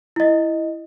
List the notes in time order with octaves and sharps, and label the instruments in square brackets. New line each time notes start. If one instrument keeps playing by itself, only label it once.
[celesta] E4 D#5